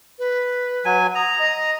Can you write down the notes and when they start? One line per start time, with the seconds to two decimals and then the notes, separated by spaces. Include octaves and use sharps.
0.19 B4
0.85 F#3 G#5
1.15 A#5 D#6
1.39 D#5